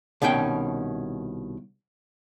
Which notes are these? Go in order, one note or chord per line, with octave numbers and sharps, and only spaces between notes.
C2 B2 D#3 C#4 G5